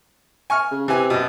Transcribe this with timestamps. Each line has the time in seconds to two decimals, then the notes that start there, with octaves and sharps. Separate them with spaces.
0.50 G#5 C#6 F6
0.71 C#3
0.88 C3 E3 G#5
1.10 F#2 B2